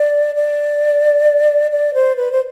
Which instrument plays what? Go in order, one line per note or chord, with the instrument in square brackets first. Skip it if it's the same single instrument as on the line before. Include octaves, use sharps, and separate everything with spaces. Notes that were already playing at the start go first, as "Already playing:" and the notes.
Already playing: [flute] D5
D5
D5
C5
B4
C5